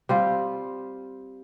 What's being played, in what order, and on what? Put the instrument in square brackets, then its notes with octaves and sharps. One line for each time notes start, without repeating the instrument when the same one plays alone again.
[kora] G3 C4 F4